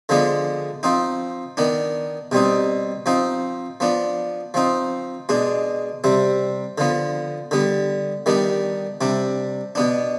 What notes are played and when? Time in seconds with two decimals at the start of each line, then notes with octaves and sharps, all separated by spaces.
0.09 D3 F3 G#3 B3 D4
0.83 F3 C4 D#4
1.57 D#3 B3 D4
2.32 B2 G3 C4 D#4
3.06 F3 C4 D#4
3.80 F3 B3 D4
4.54 F3 C4 D#4
5.29 B2 G#3 D4
6.04 C3 G3 C4
6.78 D3 F3 B3
7.51 D3 G3 B3
8.26 D#3 G3 B3 D4
9.01 C3 G3 D4
9.75 B2 B3 D4